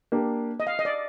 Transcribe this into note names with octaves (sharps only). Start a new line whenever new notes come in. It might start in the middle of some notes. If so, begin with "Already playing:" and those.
A#3 D4 G4
D#5
F5
D#5
D5